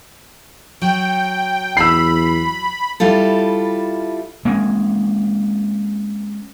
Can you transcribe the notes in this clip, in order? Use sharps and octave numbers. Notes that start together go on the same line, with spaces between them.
F#3 G5
E2 B5 E6 C7
G3 E4 F4 A4
G#3 A#3 C4 C#4